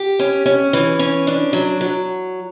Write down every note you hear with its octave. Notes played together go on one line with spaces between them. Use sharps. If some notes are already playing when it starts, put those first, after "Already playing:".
Already playing: G4
C#4
C#4
E3
C#4
D4
F#3
F#3